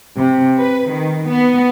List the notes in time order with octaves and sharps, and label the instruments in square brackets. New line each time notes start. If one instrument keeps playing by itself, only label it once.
[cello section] C3
B4
D#3
B3